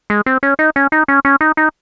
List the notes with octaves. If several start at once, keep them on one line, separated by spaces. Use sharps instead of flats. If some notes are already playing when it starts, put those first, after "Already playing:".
G#3
C4
C#4
D#4
C#4
D#4
C#4
C#4
D#4
D#4